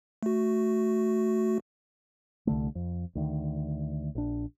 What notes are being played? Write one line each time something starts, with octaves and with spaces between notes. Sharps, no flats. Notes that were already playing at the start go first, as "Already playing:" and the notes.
A3 F#4
C2 D3 A3
F2
D2 D#3
A#1 D4